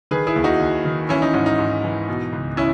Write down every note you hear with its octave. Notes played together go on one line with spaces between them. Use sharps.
D#3 G#4 B4
E4 G#4
D#2
D#4 F#4
D#2
D#3
E3 C#4 E4
D#4
G#2 C#4
D#4
G#2
E3
B2
C#2
C#4 E4